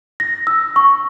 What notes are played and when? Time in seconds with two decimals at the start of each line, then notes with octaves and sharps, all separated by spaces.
0.20 A#6
0.47 E6
0.76 C#6